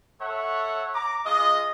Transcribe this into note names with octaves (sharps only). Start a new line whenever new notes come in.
A4 C#5 E5 F#5
A#5 D6
G#3 F4 D#5